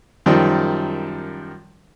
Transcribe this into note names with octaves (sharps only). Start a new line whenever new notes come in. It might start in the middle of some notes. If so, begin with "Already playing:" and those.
F#2 D#3 F3 G3